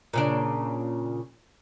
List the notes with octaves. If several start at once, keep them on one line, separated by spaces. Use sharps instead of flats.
A#2 C#3 D4